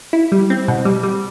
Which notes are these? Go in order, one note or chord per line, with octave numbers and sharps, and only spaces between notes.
E4
G3
C4
B2
G3
G3